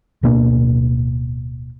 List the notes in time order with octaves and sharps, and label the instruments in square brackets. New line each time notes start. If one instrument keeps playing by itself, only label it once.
[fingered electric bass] D1 B2 A#3 D4